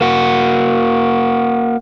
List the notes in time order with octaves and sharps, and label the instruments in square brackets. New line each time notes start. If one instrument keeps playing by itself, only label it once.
[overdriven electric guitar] A#3 F#4